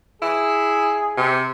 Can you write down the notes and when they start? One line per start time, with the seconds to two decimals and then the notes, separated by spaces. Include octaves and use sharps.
0.22 E4 G#4
1.17 C3